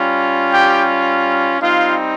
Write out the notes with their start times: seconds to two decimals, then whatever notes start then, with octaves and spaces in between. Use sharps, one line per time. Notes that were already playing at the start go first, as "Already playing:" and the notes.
Already playing: G3 C#4 F4
0.52 G4 G5
1.61 G3 C4 D#4 F4 F5